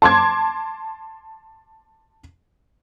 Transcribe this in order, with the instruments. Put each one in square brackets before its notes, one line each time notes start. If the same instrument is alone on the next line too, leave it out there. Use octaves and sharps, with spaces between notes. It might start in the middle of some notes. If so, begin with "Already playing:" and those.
[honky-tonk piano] A5 C6 D6 G#6